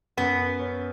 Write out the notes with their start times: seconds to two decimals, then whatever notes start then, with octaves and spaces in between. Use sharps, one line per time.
0.17 F#2 B3
0.60 C#4